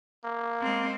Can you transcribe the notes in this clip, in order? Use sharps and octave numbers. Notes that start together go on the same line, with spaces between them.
A#3
G#3 C4